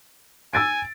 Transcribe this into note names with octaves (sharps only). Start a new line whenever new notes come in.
G#5 E6 A6 D7